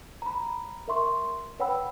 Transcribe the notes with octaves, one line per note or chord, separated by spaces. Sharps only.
A#5 B5
A#4 E5 C6 C#6
B4 C#5 F#5 G5 B5 E6